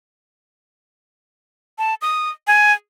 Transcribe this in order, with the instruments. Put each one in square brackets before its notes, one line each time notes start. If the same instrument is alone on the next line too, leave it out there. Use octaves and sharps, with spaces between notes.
[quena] A5
D#6
G#5